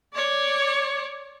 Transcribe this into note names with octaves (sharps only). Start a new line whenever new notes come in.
C#5 D5